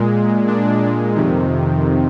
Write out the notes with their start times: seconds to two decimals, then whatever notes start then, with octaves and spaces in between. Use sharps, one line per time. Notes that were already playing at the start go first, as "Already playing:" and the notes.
Already playing: A#2 G#3
0.47 D4
1.15 F2 C3 D#3